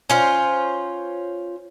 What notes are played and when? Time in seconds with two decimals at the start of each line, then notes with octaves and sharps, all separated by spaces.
0.10 C#4 F4 C5